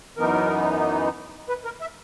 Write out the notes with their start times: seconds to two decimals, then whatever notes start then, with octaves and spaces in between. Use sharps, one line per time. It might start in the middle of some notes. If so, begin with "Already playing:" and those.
0.17 F#2 E3 B3 D#4 A#4
1.49 B4
1.65 A#4
1.81 E5